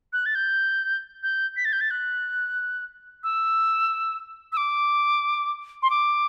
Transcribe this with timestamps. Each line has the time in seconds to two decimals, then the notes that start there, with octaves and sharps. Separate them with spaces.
0.13 F#6
0.26 A6
0.35 G6
1.23 G6
1.57 B6
1.65 A6
1.73 G6
1.81 A6
1.91 F#6
3.24 E6
4.52 E6
4.57 D6
5.83 C6
5.90 D6